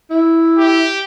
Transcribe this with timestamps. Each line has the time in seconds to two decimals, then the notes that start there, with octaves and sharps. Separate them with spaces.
0.10 E4
0.58 G4